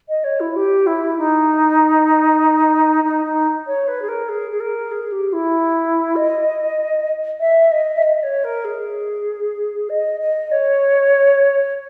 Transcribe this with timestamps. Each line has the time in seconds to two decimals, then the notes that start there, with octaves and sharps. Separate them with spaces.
0.08 D#5
0.24 C#5
0.40 E4
0.56 G4
0.86 E4
1.17 D#4
3.04 D#4
3.25 D#4
3.66 C#5
3.87 B4
4.02 G#4
4.08 A#4
4.29 G#4
4.50 G#4
4.60 A#4
4.91 G#4
5.11 G4
5.33 E4
6.16 D#5
7.40 E5
7.71 D#5
7.97 E5
8.02 D#5
8.23 C#5
8.44 A#4
8.64 G#4
9.89 D#5
10.20 D#5
10.51 C#5